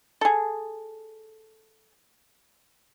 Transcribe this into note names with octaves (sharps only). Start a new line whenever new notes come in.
G#4 A4